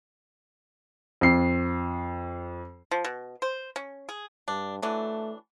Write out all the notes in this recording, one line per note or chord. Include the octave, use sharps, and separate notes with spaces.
F2 C7
F3
B2
C5
C#4
G#4
G2 D4
E3 F#3 A3 D4